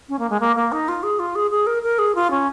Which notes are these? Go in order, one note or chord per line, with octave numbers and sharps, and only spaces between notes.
C#4
A#3
G#3
A#3
A#3
D#4
F4
G#4
F4
G#4
G#4
A#4
A#4
G#4
F4
C#4